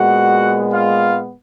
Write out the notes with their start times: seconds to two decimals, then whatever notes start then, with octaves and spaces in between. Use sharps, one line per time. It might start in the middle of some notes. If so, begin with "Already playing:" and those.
Already playing: A#2 G#3 B3 F#4 F#5
0.73 F4 F5